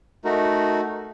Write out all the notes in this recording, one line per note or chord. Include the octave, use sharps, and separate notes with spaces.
A3 D#4 F#4 A#4